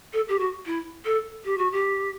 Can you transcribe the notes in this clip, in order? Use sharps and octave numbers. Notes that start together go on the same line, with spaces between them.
A4
G4
F#4
E4
A4
G4
F#4
G4